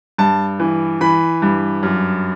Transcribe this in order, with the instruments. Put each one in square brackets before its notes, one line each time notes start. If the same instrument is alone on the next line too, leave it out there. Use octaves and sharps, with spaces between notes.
[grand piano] G2 A5
E3
E3 B5
G2
F#2